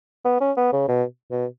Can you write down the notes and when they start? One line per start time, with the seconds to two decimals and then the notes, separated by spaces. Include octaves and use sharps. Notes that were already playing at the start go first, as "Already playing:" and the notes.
0.25 B3
0.41 C#4
0.57 B3
0.73 C#3
0.88 B2
1.31 B2